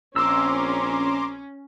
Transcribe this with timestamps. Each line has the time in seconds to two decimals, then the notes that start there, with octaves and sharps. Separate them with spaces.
0.16 A#1 C4 C#4 A#5 C6 D6 E6